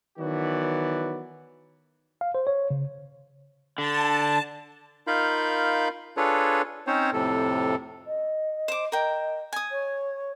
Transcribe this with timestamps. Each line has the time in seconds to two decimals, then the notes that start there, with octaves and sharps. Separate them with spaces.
0.19 D#3 E3 F#3 B3 F#4 D5
2.21 F5
2.35 C5
2.47 C#5
2.70 C#3
3.78 D3 A5
5.07 D#4 F4 A#4 F5 B5 G6
6.17 D4 F4 G#4 A4 B4 C#5
6.87 C4 C#4 D#4 C5 C#5
7.13 F2 A2 C3 A4
8.06 D#5
8.68 C5 D6
8.92 A#4 D#5 G5
9.53 G#5 D#6
9.71 C#5